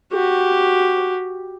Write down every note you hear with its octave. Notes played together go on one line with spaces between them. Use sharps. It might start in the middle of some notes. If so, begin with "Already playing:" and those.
F#4 G4